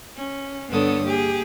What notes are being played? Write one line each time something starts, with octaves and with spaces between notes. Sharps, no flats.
C#4
G2 D3 B3 A4 C#5 D#6
A#3 G4 G#4